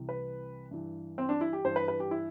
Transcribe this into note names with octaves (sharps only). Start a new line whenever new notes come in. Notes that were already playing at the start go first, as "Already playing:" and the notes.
Already playing: C2 C3 E3
B4
G2 E3
C4
D4
E4
G4
G2 E3 C5
B4
B4
G4
E4